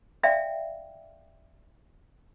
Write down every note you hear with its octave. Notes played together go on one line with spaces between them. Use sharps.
D5 E5 F5 G5